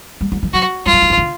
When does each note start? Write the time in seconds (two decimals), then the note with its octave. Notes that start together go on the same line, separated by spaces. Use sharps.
0.21 G3
0.32 F#3
0.43 F3
0.53 F#3 F#4
0.85 G3 F4
0.93 F#3
1.02 F3
1.10 E3
1.18 D3